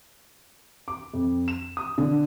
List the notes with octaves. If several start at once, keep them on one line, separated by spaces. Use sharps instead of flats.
D6
F2
E7
D#6
D3